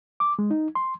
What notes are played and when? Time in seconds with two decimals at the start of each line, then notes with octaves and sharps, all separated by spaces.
0.20 D6
0.39 G#3
0.51 D#4
0.75 C6